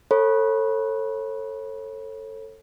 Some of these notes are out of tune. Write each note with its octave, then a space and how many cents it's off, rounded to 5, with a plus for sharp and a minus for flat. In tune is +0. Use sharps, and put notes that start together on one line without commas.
A4 +20 C#5 -40 B5 -25